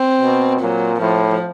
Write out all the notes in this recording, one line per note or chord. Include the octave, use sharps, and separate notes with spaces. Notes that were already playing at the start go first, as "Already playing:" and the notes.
Already playing: C4
B2
A#2 F#3
A2 F3